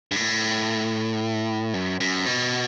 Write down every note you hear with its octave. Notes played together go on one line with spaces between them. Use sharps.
G2
A2
F#2
F#2
B2